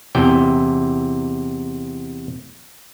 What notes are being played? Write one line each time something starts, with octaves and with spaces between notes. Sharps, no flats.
E2 C3 G5